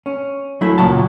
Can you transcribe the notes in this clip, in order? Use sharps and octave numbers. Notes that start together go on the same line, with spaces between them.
C#4
F#3 A3 E4
C#2 A#2 F#3 A5